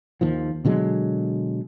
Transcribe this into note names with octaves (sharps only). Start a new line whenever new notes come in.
D#2 D#3 F3
B2 D3 F#3 G#3